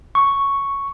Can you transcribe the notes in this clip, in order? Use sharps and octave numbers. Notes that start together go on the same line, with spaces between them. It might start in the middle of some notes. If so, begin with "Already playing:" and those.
C#6